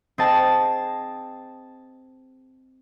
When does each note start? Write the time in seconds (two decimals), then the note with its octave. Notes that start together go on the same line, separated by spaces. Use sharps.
0.18 C4 G#4 D#5 A5